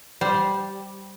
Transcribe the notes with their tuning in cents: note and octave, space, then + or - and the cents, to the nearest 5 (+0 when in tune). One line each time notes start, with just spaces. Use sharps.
G3 -10 C5 -5